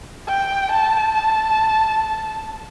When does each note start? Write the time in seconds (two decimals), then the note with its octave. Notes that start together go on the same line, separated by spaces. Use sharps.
0.29 G5
0.72 A5
1.15 A5